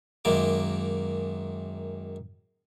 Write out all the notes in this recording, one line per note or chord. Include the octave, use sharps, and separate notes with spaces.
F#2 D#3 G#3 A#3 D6